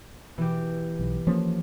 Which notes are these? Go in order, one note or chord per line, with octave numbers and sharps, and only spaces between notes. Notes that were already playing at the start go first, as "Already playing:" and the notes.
B2 E3 G4
B1
F3 A#3 C#4